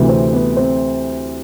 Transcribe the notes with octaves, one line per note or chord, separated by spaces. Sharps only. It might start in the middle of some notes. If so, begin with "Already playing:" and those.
Already playing: D2 C3 E3
C4
B3
C4